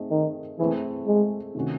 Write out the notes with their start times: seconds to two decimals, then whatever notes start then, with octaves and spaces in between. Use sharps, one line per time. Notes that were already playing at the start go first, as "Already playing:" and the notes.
Already playing: A3 C4 D#4 G#4 D#5
0.11 D#3
0.59 E3 A3 C4 E4 G#4
1.07 G#3
1.55 C3 D#3 A3 C#4 F#4